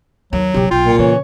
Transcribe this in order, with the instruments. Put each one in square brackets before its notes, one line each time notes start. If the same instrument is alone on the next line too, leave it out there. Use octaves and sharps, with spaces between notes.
[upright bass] D#2 [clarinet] F#3
[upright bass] F#1 B1 [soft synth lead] G4
[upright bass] B1 [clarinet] F4 [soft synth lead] G5
[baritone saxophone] A#2
[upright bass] C#3 [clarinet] E3 [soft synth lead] C#5